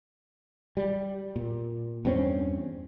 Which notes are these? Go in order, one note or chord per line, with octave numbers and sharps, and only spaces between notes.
G3
A#2
E2 G2 C4 C#4